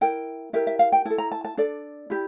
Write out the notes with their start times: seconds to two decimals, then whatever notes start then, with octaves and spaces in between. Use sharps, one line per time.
0.01 E4 A#4 G5
0.53 E4 G4 A#4 E5
0.67 E5
0.79 F5
0.92 G5
1.05 E4 A4 A5
1.18 A#5
1.31 A5
1.44 A5
1.57 D4 A4 D5
2.10 E4 G4